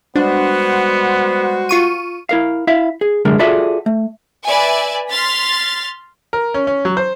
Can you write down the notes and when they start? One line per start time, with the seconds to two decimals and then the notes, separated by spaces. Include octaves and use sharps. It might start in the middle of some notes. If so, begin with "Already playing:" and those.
0.16 G3 G#3 B3 D4 F#4 C5
1.69 F4 C#6 D#7
2.29 E4 A#4 F5
2.67 E4 E5 F5
3.01 G#4
3.25 C2 F#2 D3 G#3 A#4
3.39 F4 F#4 G#4 A4 D5 E5
3.86 A3
4.45 B4 D5 E5 G#5
5.09 C6 F6 A6 B6
6.33 A#4
6.54 C#4
6.67 C#4
6.85 F#3
6.97 C5